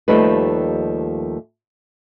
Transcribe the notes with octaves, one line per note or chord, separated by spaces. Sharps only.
D#2 F3 G3 A3 D#4 B4